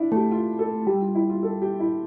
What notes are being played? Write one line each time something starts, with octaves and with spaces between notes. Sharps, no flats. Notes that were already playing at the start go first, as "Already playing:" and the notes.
Already playing: D4 E4
A3 G4
F4
A4
G3 G4
F4
E4
F4
A4
G4
E4